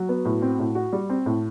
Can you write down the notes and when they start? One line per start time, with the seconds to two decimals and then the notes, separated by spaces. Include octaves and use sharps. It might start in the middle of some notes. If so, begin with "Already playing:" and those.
Already playing: F#3 F#4
0.09 B3
0.25 A2
0.42 C4
0.59 A2
0.75 F#4
0.93 G3
1.10 C4
1.26 A2